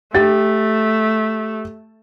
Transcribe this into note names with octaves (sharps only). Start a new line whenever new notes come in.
A3 G4 A6